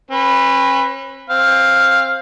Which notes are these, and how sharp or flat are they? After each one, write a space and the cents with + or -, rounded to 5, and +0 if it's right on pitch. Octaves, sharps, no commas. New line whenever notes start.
C#4 -45 B4 +0
C4 +20 F5 +0